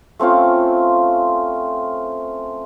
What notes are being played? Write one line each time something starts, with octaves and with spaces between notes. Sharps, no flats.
A3 C4 C#4 F4